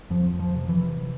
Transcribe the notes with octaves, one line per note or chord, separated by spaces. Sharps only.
F2 F3
F3
C3
E3